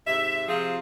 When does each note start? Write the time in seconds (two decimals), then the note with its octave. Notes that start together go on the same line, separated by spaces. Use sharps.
0.07 G#2 C3 E5
0.48 C3 F3 C4 F4 G#4